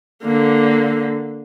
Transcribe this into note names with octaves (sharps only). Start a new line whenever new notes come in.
D3 A#3